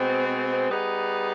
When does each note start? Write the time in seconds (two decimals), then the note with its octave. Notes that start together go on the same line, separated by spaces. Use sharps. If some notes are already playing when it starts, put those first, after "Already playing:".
Already playing: B2 G#3 C4
0.70 G3 B3 D#4 G#4 B4